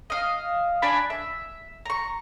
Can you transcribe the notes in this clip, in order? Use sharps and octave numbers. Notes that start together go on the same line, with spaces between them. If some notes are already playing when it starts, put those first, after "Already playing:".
D#5 F5
D4 D5 G#5 B5
E5
A#5 C#6